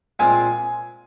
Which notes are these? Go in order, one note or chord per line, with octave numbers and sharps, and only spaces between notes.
A#2 G#3 C4 F4 G#5